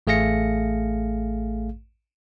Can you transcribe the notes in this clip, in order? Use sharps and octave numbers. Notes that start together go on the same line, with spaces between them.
A1 A3 G#4 F5 A#6 C#7